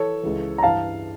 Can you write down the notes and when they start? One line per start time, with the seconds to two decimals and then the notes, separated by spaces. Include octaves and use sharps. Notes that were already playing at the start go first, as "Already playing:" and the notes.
Already playing: E3 A4 C#5
0.23 C#2 C#3 E3
0.58 A#5
0.63 G2 E3 F5 A5